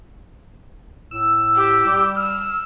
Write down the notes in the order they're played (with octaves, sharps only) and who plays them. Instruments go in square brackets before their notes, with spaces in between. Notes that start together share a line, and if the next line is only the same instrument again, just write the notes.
[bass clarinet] A2 [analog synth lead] E6
[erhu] G4
[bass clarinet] G3
[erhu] E6 [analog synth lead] F6